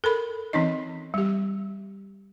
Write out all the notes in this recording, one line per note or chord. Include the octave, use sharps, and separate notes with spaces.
A4 A#4 B5
E3 C4 C#4 D#4 D#5
G3 G4